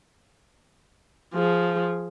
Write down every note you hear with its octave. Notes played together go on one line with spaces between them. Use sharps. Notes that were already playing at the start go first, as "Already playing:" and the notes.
F3 G#4